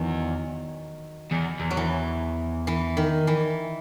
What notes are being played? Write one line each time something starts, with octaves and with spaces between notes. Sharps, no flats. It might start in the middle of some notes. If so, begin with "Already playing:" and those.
Already playing: E2 D#3 F#3
E2
E2
F#3
E3
E3
D#3
E3